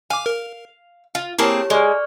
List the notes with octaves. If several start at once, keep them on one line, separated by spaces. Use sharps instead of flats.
F5 G#5 D6
A#4
F4
A#3 C4 E4 G4 G#4 A#4 C#5 A5
G#3 D5 C#6 F6